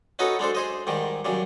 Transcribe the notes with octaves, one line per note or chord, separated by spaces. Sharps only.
C#4 D#4 F#4 A4 B4 D#5
G#3 D4 A4 C5
G#4 C5 D#5
G#2 D#3 G3
F#2 C#3 G3